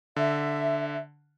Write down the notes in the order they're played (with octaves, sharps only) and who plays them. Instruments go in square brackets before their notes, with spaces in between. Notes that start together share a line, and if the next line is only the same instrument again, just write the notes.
[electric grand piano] D3 [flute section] E5